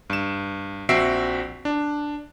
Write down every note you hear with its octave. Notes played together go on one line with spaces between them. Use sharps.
G2 E7
A#1 C4 F#4 E5 C7 D7
D4